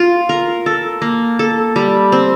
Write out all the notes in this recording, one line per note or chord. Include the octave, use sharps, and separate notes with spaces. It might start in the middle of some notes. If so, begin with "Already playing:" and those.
Already playing: F4
A#4
A4
A#3
A4
G3
C4